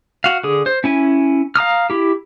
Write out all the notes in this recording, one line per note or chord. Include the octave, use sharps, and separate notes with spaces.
F#4 F5
D3 G#4
C5
C#4 E4 G#5
F5 A#5 D#6 F6
E4 G4